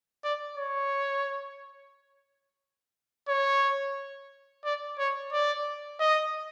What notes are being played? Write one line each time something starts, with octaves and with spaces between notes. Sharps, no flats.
D5
C#5
C#5
D5
C#5
D5
D#5